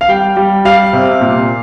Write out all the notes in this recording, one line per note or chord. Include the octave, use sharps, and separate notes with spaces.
F5
G3 G5
G3
G3 F5
C3
A#2